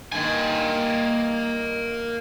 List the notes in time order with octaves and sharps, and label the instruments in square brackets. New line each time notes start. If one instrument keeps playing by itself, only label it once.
[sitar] G2 D#3 [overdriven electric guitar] A#3 G#5